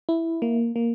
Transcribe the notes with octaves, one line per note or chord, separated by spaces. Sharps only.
E4
A#3
A#3